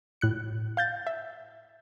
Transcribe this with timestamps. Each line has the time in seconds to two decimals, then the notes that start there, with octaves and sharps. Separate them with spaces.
0.21 A2 F#6 C#7
0.77 F5 G6 A6
1.07 E5